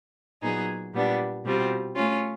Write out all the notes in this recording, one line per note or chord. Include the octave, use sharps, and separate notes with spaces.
A#2 F#3 B3 D#4 G#4
A#2 G3 B3 D4
B2 G3 C4 F4
A3 C#4 F4